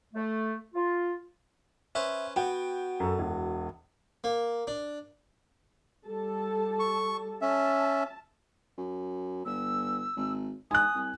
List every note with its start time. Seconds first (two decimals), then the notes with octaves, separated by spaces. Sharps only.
0.14 A3
0.75 F4
1.95 C#4 B4 C5 E5
2.36 B3 F#4 F#5 G5
3.00 F#2 A4
3.19 E1
4.24 A#3
4.67 D4
6.06 G3 A4 A5
6.80 C#6
7.42 C#4 E5 A5
8.78 F#2
9.46 G1 E6
10.16 G#1
10.71 G#2 G#5 D#6 F#6
10.95 C2